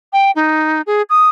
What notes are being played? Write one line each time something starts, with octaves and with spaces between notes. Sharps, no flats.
G5
D#4
G#4
D#6